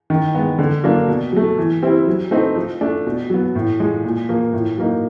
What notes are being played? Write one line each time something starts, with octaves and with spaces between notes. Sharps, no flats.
D#3
G#3 B3
D3
F#3 A#3 D4
B2
F#3 A3
E3
G3 C4 E4
F#3
A3 C4 D#4
F3
A3 D4
B2
F#3 B3
A2
F3 G#3
A#2
F3 A#3
A2
F#3 A#3 D#4